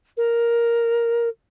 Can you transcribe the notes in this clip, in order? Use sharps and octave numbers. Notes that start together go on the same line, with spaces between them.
A#4